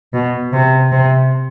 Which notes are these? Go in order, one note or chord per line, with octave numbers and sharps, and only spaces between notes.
B2
C3
C3